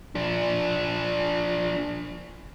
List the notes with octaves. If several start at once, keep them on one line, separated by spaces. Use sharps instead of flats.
F3 D4